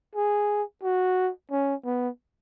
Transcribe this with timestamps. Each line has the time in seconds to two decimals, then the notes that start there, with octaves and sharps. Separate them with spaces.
0.15 G#4
0.83 F#4
1.51 C#4
1.85 B3